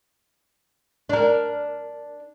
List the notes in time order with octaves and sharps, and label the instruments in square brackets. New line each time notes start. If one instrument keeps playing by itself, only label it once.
[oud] D4 A#4